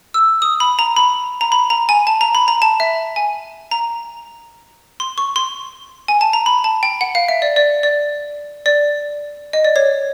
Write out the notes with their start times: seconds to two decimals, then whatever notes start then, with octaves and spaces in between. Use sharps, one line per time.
0.14 E6
0.42 D#6
0.60 B5
0.79 A#5
0.97 B5
1.41 A#5
1.52 B5
1.70 A#5
1.89 G#5
2.07 A5
2.21 A#5
2.35 B5
2.48 A#5
2.62 A5
2.80 E5
3.16 G#5
3.71 A#5
5.00 C6
5.18 C#6
5.36 C6
6.08 G#5
6.21 A5
6.33 A#5
6.46 B5
6.64 A5
6.83 G5
7.01 F#5
7.15 F5
7.28 E5
7.42 D5
7.56 D5
7.83 D5
8.66 D5
9.53 D#5
9.64 D5
9.76 C#5